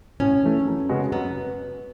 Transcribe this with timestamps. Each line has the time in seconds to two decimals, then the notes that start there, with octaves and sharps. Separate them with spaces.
0.20 A2 C#4
0.43 E3 A3
0.66 F#2
0.89 C#3 G#3 B3 F#4
1.12 F#2 B3